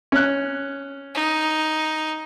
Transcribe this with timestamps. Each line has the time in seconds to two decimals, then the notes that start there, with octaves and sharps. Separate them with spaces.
0.12 C#4 F#6
1.14 D#4